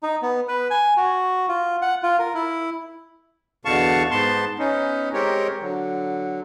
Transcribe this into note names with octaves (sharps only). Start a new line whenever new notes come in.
D#4
B3
B4
G#5
F#4
F4
F#5
F4
A#4
E4
E2 B2 D3 F5 A5 C#6
G#2 B3 A5 C6
B3 C#4 D#4
G#3 C4 G4 A#4 C#5
D3 F#3